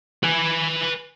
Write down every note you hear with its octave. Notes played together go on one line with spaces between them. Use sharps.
B4 G#5